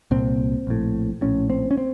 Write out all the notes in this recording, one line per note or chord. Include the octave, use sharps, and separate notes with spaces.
C2 A#2 C4
A#1 A2
A#1 A2 C#4
C4
C#4
C4